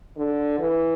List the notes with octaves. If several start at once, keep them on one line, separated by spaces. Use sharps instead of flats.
D3
E3